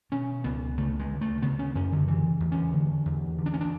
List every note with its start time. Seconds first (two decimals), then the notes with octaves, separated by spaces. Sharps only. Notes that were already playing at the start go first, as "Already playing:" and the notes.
0.12 B2 C#4
0.44 C#2 B3
0.78 C#3 A3
0.99 G#3
1.11 D2
1.21 A3
1.42 C#3 B3
1.59 C#4
1.75 F#2 C#4
1.92 D3
2.07 C#3 E3
2.40 E2
2.52 C#4
2.73 D3
3.05 E2
3.39 D3
3.46 D4
3.54 C#4
3.61 D4